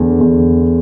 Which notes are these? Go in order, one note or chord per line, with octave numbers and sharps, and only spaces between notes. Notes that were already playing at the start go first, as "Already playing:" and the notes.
Already playing: E2 D3 A3
E2